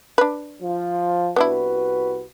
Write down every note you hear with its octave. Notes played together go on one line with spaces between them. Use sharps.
D4 B4
F3 F4
C2 B3 D4 E4 F#4 B4